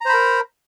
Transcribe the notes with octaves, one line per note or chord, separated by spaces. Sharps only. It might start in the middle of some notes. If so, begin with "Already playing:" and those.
A#4 C5 A#5 B5